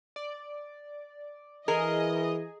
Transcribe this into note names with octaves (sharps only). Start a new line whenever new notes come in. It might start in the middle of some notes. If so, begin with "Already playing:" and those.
D5
E3 G#4 A#4 D#5